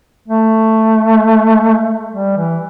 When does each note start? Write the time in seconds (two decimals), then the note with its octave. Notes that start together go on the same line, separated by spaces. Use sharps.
0.28 A3
2.13 G3
2.36 E3